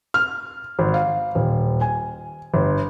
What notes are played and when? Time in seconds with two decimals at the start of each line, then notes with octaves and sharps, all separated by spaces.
0.14 F6
0.79 G#1
0.94 F5
1.35 D#1
1.81 G#5
2.54 G1